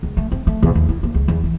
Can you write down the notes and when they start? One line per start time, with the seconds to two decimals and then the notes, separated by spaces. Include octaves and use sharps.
0.03 C#2
0.17 A3
0.32 C4
0.47 A3
0.62 E2
0.75 D#2
0.89 E4
1.03 A#3
1.14 C#2
1.28 E2
1.43 E3